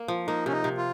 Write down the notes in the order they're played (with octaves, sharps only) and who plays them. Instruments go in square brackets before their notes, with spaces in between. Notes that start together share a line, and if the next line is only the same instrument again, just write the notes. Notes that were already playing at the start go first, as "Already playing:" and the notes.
Already playing: [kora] A#3
F3
[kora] A#3 [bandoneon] D#4
[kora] C3 [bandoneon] C#4
[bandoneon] D#4
[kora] C3
[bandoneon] F4